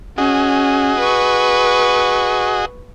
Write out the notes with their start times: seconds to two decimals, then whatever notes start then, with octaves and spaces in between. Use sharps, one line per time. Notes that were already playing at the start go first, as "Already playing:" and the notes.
0.18 C#4 F#4 G#4 D#5
0.99 B4 C#6